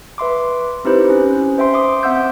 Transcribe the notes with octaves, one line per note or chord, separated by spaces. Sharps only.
B4 E5 C6 D6
C4 D#4 E4 G4 B4 C5
C#4
C5 E5 G5 C6
E5 C6 D6 D#6
C4 E5 F#5 E6 G6